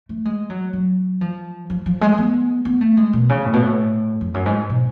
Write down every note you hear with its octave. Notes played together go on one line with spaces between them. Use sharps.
A3
G#3
F#3
F#3
F3
F3
F3
G#3
B3
B3
A3
G#3
B2
C#3
A2
B2
A2
F2
F#2
G#2
B2